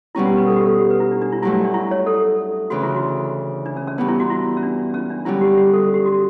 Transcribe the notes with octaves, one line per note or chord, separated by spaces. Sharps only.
B2 G3 C#4 E4
G4
B4
A4
G4
A4
G4
B4
E4
D4
D4
E4
G2 F#3 A3 E4
D4
D4
E4
C#5
A4
D2 C#3 E3 F#4
E4
F#4
D4
C#4
C#4
G2 E3 B3 D4
E4
F#4
E4
C#4
D4
C#4
D4
F#2 D3 G3 E4
G4
G4
A4
G4
F#4